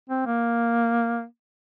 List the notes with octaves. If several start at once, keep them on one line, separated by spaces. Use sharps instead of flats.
C4
A#3